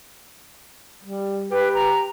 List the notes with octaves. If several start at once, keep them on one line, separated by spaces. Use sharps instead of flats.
G3
G4 B4
A#5